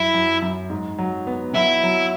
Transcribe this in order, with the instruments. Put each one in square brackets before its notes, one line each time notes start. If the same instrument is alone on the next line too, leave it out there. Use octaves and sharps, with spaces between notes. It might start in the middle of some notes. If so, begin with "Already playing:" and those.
Already playing: [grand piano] F#2 [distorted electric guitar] E4
[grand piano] F#2
F#2
G#2
F#3
B3
[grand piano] F#3 [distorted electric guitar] E4
[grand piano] F#3